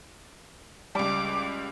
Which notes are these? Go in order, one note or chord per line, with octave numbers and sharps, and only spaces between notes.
C#2 G3 D6